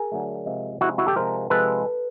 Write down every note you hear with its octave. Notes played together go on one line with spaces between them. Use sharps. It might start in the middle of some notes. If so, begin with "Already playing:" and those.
Already playing: G#4 A#4
D3 F#3 A3
C3 F3 G#3
C3 F3 G#3 E4 F#4
E4 F#4
G4 A4
C3 F3 G#3 A#4 C5
C3 F3 G#3 A4 B4